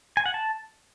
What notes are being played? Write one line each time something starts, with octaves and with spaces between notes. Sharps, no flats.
G#5
F#5
A5